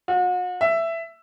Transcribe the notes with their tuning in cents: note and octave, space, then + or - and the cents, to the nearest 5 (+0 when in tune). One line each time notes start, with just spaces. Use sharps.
F#4 -40
E5 +10